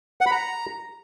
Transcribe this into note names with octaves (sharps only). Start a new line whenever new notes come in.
F#5
B5
A#5